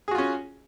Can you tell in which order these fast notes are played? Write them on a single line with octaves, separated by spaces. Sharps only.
G#4 F#4 F4 C#4